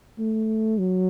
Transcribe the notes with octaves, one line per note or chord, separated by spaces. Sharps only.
A3
F#3